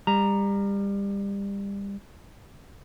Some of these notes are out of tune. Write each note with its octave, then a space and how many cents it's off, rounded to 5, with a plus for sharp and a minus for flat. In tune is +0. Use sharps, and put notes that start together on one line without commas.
G3 +30 A#5 +0